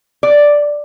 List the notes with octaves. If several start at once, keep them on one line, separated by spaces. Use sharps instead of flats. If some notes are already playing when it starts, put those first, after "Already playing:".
D5